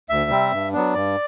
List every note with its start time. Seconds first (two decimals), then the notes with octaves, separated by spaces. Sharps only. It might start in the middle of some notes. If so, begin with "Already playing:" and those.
0.09 D2 E5
0.30 C3 G3 C4
0.53 G2
0.73 F#3 B3 D4
0.94 G2 D5